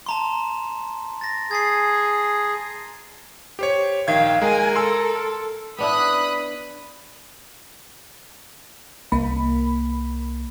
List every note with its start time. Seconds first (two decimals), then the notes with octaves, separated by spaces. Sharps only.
0.06 A5 A#5 C6
1.21 A6 A#6
1.51 G#4 G#6 A6 C7
3.59 G4 C5 C#5
4.08 A#1 D#3 F5 G5 G#6
4.42 G#3 A#4 G#5
4.76 A4 C6 E6
5.79 B3 D4 E4 B5 D#6 F#6
9.12 C2 A#3 B5